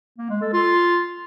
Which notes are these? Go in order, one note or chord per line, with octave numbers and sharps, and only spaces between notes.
A#3
G#3
A4
F4